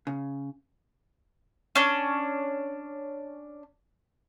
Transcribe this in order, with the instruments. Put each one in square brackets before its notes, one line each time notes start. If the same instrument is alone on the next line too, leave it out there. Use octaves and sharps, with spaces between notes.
[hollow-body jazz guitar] C#3
[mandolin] C#4 D4